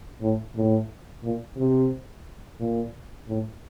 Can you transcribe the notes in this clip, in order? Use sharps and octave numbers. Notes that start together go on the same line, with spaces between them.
A2
A2
A#2
C3
A#2
A2